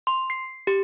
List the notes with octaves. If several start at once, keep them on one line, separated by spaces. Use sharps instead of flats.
C6
C7
G4